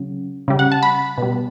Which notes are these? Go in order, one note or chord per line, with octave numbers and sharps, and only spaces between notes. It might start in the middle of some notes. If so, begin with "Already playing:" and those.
Already playing: C#3 F#3
C#3 G3
F#5
A5
B5
B2 G3